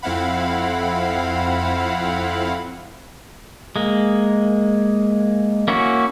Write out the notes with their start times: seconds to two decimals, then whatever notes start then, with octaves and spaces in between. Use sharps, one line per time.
0.02 F2 C4 E4 F5 F#5 B5
3.76 G#3 A#3
5.68 A#3 C#4 E4 F#4